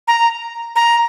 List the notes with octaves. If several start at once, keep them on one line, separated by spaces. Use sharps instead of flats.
A#5
A#5